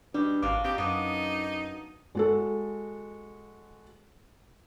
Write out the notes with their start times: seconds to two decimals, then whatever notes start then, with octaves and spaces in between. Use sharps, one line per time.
0.14 B2 G3 D4
0.42 G#1 D4 F4 F#4 D6
0.64 C4 D#4 G4
0.78 F#2 B3 D4 D#4
2.15 G#3 F#4 A4